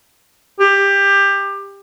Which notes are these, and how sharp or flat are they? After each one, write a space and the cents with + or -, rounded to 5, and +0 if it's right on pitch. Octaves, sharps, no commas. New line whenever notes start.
G4 +20